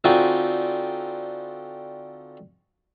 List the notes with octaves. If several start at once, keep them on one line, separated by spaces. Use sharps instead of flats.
D3 C4 D#4 F4 F#4 G#5